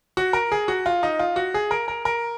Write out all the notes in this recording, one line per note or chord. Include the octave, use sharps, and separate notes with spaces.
F#4
A#4
G#4
F#4
F4
D#4
F4
F#4
G#4
A#4
A#4
A#4